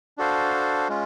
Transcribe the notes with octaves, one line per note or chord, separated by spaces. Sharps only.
D4 F#4 A4 C5 F5
G#3 C#4 F4